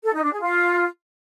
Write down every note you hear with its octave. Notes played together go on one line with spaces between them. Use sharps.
A4
D#4
D4
G#4
F4